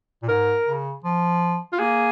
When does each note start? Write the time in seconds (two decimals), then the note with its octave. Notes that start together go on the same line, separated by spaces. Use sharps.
0.23 A#2
0.28 G#2 A#4
0.67 C#3
1.04 F3
1.73 F4
1.80 A#3 G#4